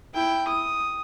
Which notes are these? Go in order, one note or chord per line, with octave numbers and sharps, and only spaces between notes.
E4 G5
D#6